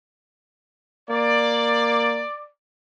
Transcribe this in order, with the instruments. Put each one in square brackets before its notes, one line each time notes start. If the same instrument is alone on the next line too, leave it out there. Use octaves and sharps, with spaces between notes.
[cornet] A#3 [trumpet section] D5